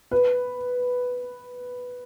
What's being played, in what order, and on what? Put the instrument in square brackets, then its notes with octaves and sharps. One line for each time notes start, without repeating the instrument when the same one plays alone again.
[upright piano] B4